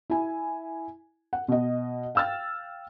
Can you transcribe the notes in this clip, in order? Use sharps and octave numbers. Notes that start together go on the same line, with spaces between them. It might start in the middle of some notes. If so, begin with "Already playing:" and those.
E4 G#5
F#5
B2 D#5
F5 G5 E6 F6 A6